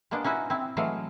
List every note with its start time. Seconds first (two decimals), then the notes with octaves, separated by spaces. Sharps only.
0.11 G#3 A#3 B3 D4
0.24 C#4 D#4 E4 F#4 B4
0.50 C4 E4
0.77 E3 F#3 G#3 A3 F5